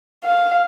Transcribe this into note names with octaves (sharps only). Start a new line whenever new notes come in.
F5